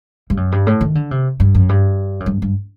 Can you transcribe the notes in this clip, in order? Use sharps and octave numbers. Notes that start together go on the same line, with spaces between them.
G2
F#2
G2
A2
D#3
D3
C3
G2
F#2
G2
F#2
G2
G2